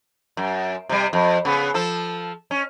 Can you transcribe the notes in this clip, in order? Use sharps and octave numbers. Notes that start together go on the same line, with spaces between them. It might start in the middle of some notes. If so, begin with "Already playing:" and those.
F#2
C3 G3
F2
C#3 B3
F3 A4
C#4